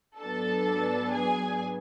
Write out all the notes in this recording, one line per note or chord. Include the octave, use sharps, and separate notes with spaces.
G#2 F#3 B3 D4 A4 A5
G#4 G#5